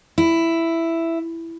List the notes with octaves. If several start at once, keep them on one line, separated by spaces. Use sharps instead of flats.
E4